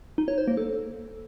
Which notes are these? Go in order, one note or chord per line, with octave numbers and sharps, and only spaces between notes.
D#4
C#5
C5
A#3
A4